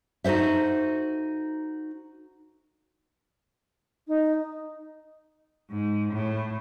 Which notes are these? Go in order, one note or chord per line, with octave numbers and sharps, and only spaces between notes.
D#4 F#4 A4 C5 E5
D#4
G#2
A2